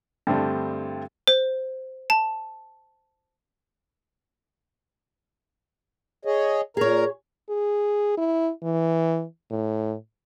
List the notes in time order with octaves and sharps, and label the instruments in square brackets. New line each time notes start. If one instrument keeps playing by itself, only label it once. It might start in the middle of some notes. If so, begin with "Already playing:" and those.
[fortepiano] G2 D3 G3 A3 C4
[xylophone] C5
A5
[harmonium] G#4 C#5 D#5
[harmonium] A#2 A#4 A#5 [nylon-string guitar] G#4 C#5
[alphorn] G#4
E4
E3
A2